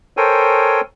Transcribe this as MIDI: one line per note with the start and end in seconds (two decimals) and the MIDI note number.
0.17 0.81 69
0.17 0.81 70
0.17 0.81 72
0.17 0.81 73
0.17 0.81 79
0.17 0.81 80